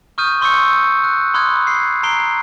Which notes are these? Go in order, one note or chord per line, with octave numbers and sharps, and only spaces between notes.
C#6 D#6 F6 G6 D#7
C6 C#6 E6 G6 C#7
F#6
B5 C6 D#6 F6 F#6 G#6
C7
A#5 C7 D7 G7